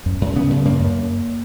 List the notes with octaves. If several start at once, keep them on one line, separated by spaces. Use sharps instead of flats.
F#2
F#2
C#3 B3
F#2
F#2 A#3
F#2